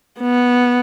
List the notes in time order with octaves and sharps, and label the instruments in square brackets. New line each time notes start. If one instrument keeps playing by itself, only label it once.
[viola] B3